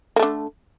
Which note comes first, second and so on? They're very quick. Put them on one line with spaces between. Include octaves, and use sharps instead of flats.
A#3 A3 D3